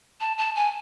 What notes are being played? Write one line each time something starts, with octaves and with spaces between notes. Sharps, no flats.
A5
A5
G#5